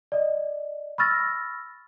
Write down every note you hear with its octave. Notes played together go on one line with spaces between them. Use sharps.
D5 D#5
B5 C#6 E6 F6 A6 A#6